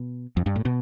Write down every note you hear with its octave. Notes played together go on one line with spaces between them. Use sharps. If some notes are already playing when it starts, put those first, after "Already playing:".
Already playing: B2
F2
G2
A2
B2